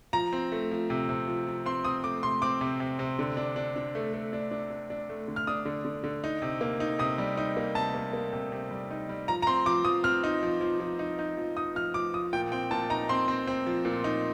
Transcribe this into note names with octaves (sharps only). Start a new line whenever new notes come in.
F3 A#5
C4
A3
F3
C3
C3
F3
F3
C4 C6
C4 D#6
A3 D6
C3 C6
C4 D6
C3
C3
C3
D3
D4
D4
D4
A3
A3
D4
D4
D4
D4
A3
D3
F6
D4 D#6
D3
D3
D3
D#4
C3
A#3
D#4
C3 D#6
G3
D#4
A#3
C3 A5
A#3
A#3
C3
C3
G3
D#4
G3
F3 A#5
A#5
C4 C6
F3 D6
F3 D#6
C4 F6
D#4
F3
F3
F3
D#4
D#4
F3
D#4 D#6
F3 F6
F3 D6
F3 D#6
A#2 G5
C4 G5
A#2 A5
D#4 A#5
C4 C6
C4
C4
F3
A#2
D#4